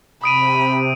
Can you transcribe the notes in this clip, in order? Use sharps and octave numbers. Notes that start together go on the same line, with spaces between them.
C3 B5 D#6 D7 D#7